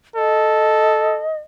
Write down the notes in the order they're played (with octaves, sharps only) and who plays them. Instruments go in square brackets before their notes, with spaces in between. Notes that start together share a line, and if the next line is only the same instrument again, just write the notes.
[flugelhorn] A4 [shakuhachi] D#5